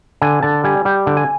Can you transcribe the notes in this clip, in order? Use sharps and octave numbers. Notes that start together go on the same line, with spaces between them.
D3 G#5
D3 A5
G3 G#5
G3 G5
D3
G#5